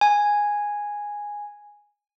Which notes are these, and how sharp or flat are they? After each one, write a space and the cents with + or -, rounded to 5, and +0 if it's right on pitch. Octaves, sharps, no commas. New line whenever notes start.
G#5 -5